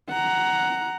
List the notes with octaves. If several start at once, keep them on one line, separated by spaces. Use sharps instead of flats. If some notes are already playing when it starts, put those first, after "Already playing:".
F#5 A#5